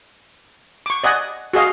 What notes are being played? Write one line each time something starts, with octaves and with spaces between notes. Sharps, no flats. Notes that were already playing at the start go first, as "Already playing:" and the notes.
C#6 D6
D5 D#5 F#5 G#5
F#4 G#4 D#5 F5